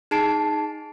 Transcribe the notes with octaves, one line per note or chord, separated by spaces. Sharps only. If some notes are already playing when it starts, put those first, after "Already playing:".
D#4 G#4 A5 C7 D7